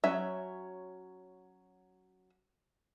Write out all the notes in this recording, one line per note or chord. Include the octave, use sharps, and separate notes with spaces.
F#3 C#4 E5